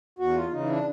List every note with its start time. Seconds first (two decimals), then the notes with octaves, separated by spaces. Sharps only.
0.19 E2 F#4
0.35 F4
0.52 C#3 E3 D#4
0.68 D4